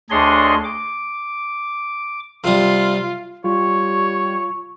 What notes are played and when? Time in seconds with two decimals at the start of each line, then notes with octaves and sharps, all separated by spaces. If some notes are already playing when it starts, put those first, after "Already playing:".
0.10 D2 D4 G#4 C#5 D#5 C6
0.64 D6
2.44 C3 G3 F4
3.44 G3 F4 C#5 C#6